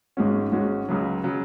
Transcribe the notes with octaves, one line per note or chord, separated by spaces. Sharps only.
G#1 G#2 G#3 C#4 F#4
G#1 G#2 G#3 C#4 F#4
C#2 C#3 F#3
C#3 F#3